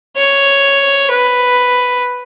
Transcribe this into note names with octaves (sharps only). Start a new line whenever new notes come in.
C#5
B4